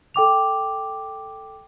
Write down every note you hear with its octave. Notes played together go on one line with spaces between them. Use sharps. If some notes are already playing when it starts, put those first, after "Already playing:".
A4 G5 D6 F7